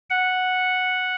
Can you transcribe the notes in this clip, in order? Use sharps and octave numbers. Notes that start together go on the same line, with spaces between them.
F#5